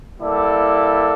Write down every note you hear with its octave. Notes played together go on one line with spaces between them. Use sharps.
G3 A#3 E4 A4 D5